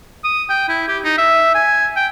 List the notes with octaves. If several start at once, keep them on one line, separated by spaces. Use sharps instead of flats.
D#6
G5
E4
G4
D#4
E5
G#5
G5